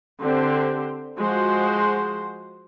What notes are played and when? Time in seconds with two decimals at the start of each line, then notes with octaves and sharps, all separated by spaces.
0.20 D3 C4 G4 C5
1.17 F3 G#3 F#4 C5